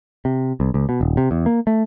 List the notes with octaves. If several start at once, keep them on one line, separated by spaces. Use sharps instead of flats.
C3
C2
C#2
B2
D#1
C3
E2
A#3
A3